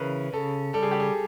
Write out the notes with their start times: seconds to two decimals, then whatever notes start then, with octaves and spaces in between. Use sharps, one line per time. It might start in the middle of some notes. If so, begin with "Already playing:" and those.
Already playing: C#3 E3 A#4 B4 C#5
0.33 C#3 A4
0.74 G3 A4
0.83 G#4
0.91 G4
1.00 G#4